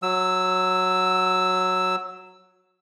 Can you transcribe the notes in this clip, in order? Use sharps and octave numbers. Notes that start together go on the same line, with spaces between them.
F#3 E6